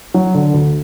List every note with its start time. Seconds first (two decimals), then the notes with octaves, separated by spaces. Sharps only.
0.14 F#3
0.34 D3
0.54 D2